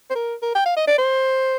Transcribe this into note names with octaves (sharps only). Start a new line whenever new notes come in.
C5
A#4
A#4
G5
F5
D#5
D5
C5